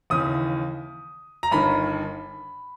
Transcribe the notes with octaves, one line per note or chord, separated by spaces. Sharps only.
D#2 C#3 E3 D#6
A#5
G1 G2 D#3 B5